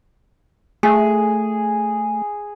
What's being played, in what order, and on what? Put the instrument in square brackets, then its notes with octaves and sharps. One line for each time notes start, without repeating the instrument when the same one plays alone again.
[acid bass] A3 [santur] G#4